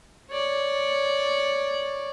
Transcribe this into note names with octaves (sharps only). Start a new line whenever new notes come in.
C#5 D5